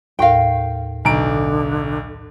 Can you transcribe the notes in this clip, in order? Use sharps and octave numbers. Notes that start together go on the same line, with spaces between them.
D#2 A2 A#4 F5 G5
B1 D3 A#5 D7